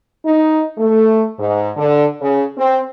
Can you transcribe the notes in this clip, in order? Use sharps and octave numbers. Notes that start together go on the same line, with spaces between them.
D#4
A3
G#2
D3
C#3
C4